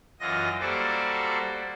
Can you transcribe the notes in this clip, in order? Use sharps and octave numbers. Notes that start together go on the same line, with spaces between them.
F#2 E3 F#3 F4 D#5 A#6
G3 A#3 F#4 A4 C5 D5